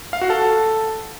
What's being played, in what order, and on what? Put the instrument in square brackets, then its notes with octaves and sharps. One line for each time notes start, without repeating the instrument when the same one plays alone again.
[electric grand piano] F5
F#4
A4